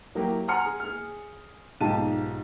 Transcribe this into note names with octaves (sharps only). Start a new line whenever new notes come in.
F#3 A#3 E4 G4
F#5 G#5 A#5 C6 F6 C#7
G#4
G#4 F6
B1 G#2 F4 G4 A5 D#7